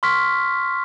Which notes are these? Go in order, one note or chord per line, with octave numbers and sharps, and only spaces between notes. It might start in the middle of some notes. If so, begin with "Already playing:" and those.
C6 C#6 F6 B6